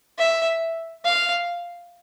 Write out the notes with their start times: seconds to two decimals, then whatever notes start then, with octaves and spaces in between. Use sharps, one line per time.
0.18 E5
1.05 F5